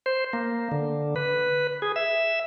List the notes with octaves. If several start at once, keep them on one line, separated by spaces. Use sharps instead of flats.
C5
A#3
D3
B4
G#4
E5